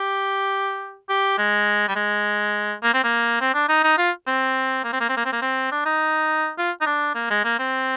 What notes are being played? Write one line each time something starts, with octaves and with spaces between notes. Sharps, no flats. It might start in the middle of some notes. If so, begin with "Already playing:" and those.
Already playing: G4
G4
G#3
G3
G#3
A#3
C4
A#3
C4
D4
D#4
D#4
F4
C4
A#3
C4
A#3
C4
A#3
C4
A#3
C4
D4
D#4
F4
D#4
D4
A#3
G#3
A#3
C4